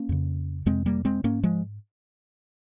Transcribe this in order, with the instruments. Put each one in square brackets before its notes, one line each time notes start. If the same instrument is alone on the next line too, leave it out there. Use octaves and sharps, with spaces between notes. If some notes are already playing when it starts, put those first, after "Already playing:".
Already playing: [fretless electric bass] A#3 C#4
F2 C#3
F2 C3 G#3 C4
G3 A#3
G#3 C4
G#2 A#3 C#4
F3 G#3